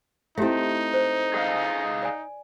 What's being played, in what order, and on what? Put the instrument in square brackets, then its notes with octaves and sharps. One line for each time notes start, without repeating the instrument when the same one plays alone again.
[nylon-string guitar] A3 C4 [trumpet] D#4 [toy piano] E4 G4 E5
[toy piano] C5
[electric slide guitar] G#4 D#5 F5 [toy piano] F#5
[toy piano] D5 G#5